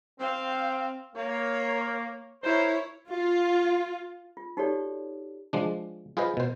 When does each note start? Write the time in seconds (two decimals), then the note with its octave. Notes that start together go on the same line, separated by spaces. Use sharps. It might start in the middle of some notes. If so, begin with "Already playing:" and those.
0.20 C4 F5
1.16 A#3 C#5
2.43 E4 A#4 C5 C#5
3.09 F4
4.37 F4
4.57 D#4 F#4 G4 A4 C#5 D5
5.53 F3 G#3 D4
6.17 F4 G#4 B4 C5 D#5
6.37 B2 C5